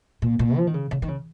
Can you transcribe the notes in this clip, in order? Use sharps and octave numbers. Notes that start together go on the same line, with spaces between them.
A#2
A#2
F3
D#3
C#3
C#3
D#3
C#3